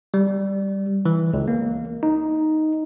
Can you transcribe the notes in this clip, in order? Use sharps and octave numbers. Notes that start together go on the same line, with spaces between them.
G3
E3
C#2
A#3
D#4